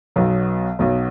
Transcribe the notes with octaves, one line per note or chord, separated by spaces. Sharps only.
B1 B2 F#3
B1 B2 F#3